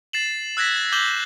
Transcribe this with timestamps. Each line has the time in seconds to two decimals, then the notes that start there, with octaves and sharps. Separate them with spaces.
0.13 A6 C7 E7 F#7
0.57 E6 F#6 G#6 A#6 B6
0.76 A6
0.92 D6 G6 F#7 G7